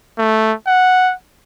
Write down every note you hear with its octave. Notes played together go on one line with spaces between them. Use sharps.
A3
F#5